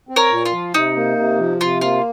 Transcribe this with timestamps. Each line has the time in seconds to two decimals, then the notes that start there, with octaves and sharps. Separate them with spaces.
0.09 C4
0.16 A#4 C#5
0.31 A#2
0.45 F4
0.52 F3
0.74 C3 D#4
0.96 A#3
1.17 C3
1.39 F3
1.61 C3 F4
1.81 A#3 F4